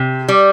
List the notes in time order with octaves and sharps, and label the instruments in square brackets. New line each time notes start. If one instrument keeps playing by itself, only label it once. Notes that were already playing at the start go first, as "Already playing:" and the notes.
Already playing: [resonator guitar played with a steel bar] C3
G3